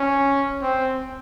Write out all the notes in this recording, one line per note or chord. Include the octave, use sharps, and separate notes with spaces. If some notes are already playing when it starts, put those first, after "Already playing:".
Already playing: C#4
C4